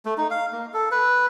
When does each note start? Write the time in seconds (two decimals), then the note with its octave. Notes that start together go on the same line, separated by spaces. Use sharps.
0.05 A3
0.18 D#4
0.31 F5
0.53 A#3
0.74 A4
0.91 B4